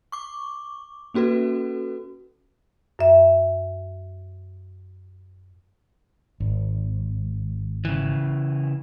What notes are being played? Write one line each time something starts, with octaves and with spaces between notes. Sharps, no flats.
C#6 D6
A#3 C#4 F#4 A4 B4
F#2 E5
G#1
C#3 E3